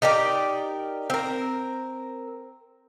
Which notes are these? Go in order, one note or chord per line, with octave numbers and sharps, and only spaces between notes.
D#4 G4 A#4 D5
C4 A#4